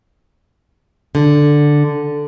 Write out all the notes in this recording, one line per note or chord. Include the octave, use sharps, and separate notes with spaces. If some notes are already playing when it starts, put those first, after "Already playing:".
D3